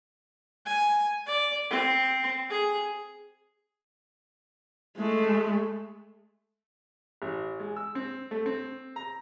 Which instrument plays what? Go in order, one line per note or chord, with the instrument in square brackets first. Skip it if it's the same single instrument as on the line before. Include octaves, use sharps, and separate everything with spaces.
[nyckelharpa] G#5
D5
C4
G#4
[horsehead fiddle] G#3 A3
[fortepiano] A1
G#3
E6
C4
A3
C4
A#5